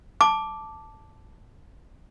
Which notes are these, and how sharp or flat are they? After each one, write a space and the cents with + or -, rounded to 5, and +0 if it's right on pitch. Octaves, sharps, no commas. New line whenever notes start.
A5 +0 D6 +0